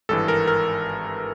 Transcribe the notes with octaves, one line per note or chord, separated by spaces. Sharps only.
G#1 G2 E3 A4
A#4
A#4